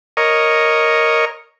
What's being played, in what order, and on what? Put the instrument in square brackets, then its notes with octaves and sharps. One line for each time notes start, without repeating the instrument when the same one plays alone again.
[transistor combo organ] A#4 C#5 D#5